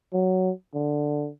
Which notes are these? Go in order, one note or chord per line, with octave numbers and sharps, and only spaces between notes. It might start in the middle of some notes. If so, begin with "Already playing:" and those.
F#3
D3